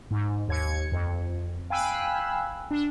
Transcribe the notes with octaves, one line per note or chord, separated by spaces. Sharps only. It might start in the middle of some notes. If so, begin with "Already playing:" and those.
G#2
D#2 G#6 C#7
F2
F5 G5 G#5 B5 E6 F#6
D4